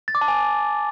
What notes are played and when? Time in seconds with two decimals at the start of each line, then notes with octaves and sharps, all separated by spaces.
0.08 A6
0.15 D6
0.21 A5
0.28 G#5